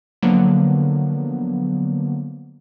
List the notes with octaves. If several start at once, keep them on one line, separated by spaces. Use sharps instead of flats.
D3 F3 F#3 A#3 B3